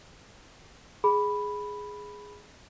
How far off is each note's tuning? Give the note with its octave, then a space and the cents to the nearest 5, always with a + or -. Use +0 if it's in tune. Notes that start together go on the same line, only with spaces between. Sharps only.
G#4 +0 B5 +0